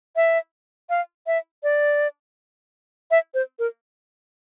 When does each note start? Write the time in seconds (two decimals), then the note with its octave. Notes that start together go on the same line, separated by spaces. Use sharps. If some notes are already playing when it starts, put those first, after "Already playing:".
0.16 E5
0.90 F5
1.27 E5
1.63 D5
3.11 E5
3.34 C5
3.59 A#4